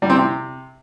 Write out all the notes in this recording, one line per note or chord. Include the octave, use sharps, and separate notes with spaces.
G3
C4
C3